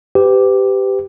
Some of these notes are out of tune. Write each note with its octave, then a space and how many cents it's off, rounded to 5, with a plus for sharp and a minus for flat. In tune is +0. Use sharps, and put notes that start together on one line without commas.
G4 +0 B4 +35